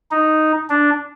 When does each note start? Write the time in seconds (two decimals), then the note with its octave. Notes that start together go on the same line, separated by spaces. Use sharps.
0.11 D#4
0.70 D4